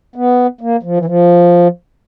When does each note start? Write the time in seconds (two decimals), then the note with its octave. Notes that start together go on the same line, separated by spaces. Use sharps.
0.16 B3
0.61 A#3
0.83 F3
0.97 E3
1.05 F3